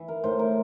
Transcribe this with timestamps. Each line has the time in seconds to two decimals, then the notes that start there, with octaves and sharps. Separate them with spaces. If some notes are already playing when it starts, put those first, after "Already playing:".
Already playing: E3
0.08 A#4
0.24 A2 C5
0.39 A#4